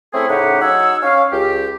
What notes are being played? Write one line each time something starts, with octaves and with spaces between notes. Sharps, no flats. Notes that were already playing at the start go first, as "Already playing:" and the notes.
A3 C4 C#4 E4 G#4 A4
A2 C#3 D#4 G4 F#5
F#3 D#4 F#5 G#5 E6
C#4 F5
C#2 G4